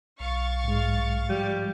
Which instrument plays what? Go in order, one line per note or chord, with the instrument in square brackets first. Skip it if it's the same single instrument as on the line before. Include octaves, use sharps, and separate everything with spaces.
[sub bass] B1 [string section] F5 C#6 A6
[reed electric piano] G#2 G#3
[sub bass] F3 [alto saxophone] G3